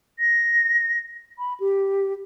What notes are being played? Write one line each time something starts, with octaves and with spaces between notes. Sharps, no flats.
A#6
B5
G4